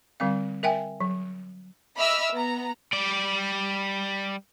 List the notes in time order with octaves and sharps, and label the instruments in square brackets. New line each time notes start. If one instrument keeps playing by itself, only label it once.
[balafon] D3 G3 C4 F5
A#4 E5 G5 G#5
F#3
[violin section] D#5 E5 B5 D6 E6 F6
B3 A#5
[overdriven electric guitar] G3 D5